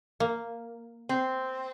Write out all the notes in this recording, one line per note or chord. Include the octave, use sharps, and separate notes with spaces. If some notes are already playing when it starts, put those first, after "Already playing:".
A#3
C4